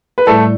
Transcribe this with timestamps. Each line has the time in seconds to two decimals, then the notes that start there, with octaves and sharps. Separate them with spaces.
0.18 B4
0.27 A2 G3 A3 A4